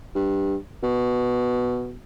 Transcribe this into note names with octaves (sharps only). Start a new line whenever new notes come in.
G2
B2